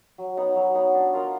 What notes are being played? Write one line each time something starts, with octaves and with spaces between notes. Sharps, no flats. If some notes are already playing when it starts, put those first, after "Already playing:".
F#3
B3 D#4
F#3
B3 D#4
D4
F4 A#4 D#5